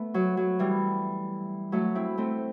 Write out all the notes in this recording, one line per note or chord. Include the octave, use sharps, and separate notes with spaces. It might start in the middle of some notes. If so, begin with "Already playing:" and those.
Already playing: A3 B3
F#3
F#3
E3 G3
F#3 A3
C4 E4
A3 C4